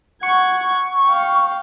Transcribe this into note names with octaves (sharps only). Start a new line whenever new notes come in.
F#5 C#6 G#6
F5 G5